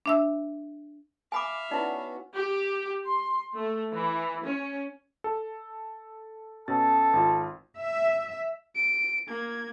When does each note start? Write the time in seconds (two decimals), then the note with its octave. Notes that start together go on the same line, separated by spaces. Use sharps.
0.06 D4 E5 E6
1.32 E5 F5 G#5 B5 D6
1.71 B3 C#4 D#4 E4 F#4 D5
2.35 G4
3.06 C6
3.56 A3
3.92 E3
4.45 C#4
5.24 A4
6.68 B2 C#4 A4 A6
7.13 G#1 F4
7.79 E5
8.76 D7
9.29 A#3 G#6